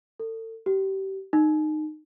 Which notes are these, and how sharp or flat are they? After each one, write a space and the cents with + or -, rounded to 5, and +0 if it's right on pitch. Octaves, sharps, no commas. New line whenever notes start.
A4 +35
G4 -30
D#4 -20